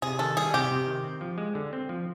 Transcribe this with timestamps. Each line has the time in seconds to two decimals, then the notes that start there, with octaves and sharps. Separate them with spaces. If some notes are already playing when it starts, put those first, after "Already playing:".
0.02 C3 G#4
0.19 D#3 A4
0.37 G3 G#4
0.54 C3 G4
0.71 C3
0.87 D#3
1.04 C4
1.21 F3
1.38 G#3
1.55 D3
1.73 C4
1.89 F3